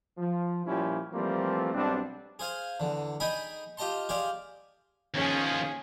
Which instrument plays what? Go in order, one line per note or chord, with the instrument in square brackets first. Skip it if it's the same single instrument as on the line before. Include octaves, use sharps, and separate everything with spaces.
[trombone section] F3
A#2 F3 G3 C#4 E4 G4
E3 F3 G3 A3 A#3 C4
B1 G3 C4 D4
[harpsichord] G#4 C5 F5 G#5
E2 D3
D#4 G#4 D#5 G5 G#5 B5
F4 G4 D#5 A5 C6
G4 G#4 C5 D5 F5
[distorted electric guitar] D#2 F3 [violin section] C#4 G#4